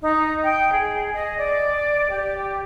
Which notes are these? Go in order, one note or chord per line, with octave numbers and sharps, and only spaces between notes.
D#4
G5
G#4
D#5
D5
G4